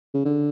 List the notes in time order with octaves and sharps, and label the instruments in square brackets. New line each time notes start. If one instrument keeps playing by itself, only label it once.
[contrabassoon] C#3
D3